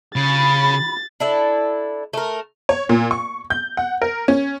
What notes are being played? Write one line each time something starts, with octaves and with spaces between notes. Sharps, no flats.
C#3 B5 A6
D4 E4 A4
A3 A#4
C#5
A#2
C#6
G6
F#5
A#4
C#4